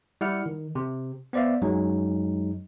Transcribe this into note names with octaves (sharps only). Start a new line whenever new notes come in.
G3 E4 F#5 F6 C#7
D#3
C3
B3 C5 D5 E5 F5
F#2 F#3 G#3 D#4